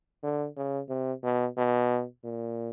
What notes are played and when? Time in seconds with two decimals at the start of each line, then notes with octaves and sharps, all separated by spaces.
0.23 D3
0.57 C#3
0.89 C3
1.23 B2
1.57 B2
2.24 A#2